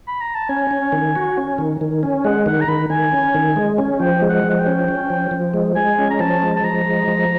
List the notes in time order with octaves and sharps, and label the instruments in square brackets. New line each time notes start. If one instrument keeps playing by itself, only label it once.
[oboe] B5
A#5
A5
[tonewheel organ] C#4 [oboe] G#5
[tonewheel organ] C#4
D#3
F#4
C#4
D#3
D#3
C#4
[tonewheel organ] G#3 [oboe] F#5
[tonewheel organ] D#3 [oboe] F#5
[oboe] A#5
[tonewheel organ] D#3 [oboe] B5
[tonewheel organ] D#3 [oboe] G#5
[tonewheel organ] C#4
D#3
G#3
C#4
[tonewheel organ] F3 [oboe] G5
[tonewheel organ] G#3
[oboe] F#5
[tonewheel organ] F3
[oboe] F#5
G5
[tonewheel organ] C#4
C#4
F3
F3
G#3
[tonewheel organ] G#3 [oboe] G#5
[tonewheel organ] C#4
[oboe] A#5
[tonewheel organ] F3 [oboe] A5
[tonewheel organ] G#3
[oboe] A5
[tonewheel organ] F3 [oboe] A#5
[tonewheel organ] G#3
F3